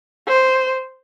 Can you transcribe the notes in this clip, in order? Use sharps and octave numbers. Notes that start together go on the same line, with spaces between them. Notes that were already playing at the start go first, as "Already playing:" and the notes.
C5